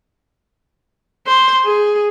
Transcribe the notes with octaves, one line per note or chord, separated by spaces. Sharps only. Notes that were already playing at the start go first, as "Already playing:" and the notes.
C5
G#4